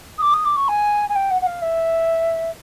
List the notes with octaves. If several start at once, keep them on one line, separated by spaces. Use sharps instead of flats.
D#6
D6
D#6
D6
C#6
G#5
G#5
G5
F#5
F#5
F5
E5